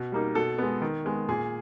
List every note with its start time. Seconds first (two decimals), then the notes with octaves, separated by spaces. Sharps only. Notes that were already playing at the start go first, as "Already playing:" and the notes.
Already playing: B2
0.12 G3 A#3 D#4
0.35 B2 A4
0.58 G#3 B3
0.82 D#3
1.05 G#3 B3
1.28 A#2 G#4